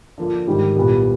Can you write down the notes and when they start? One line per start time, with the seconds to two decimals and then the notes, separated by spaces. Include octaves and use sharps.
0.18 D3 F3 A#3
0.47 G#2 D#3 G3
0.76 C2 A#2 G3 B3